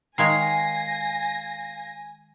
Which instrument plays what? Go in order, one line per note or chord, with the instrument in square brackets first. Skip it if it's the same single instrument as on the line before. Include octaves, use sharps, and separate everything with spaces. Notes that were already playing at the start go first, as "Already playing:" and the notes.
[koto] D#3 G#3 C#5 [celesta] F5 C7 [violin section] G#5 A#6